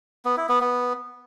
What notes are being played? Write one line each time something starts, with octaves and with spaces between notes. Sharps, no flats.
B3
E4
B3
B3